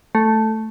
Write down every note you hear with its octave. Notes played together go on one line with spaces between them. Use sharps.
A3